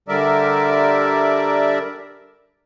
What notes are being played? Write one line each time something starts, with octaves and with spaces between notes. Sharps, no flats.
D3 G3 A#4 D5 E5